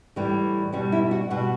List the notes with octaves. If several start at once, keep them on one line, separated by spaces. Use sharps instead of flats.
A2 E3 G3
B2 G3 C#4
E4
F#4
B2 G3 F#4